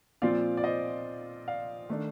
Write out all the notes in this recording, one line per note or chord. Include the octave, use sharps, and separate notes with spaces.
A#2 F3 C4 F4 D5 F5
D5
C5 D#5
D5 F5
D#3 A3 D4